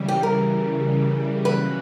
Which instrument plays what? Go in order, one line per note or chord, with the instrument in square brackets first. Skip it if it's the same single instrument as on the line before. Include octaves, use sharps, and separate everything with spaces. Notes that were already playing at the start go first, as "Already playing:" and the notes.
Already playing: [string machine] C#3 E3 G3
[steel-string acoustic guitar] G4
A#4
[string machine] B2 F#3 A#3 C#4 F#4 [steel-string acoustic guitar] B4